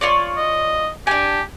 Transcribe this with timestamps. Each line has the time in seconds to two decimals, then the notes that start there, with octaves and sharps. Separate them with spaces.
0.01 F4 C#5 D5
0.37 D#5
1.07 D4 G4 G#5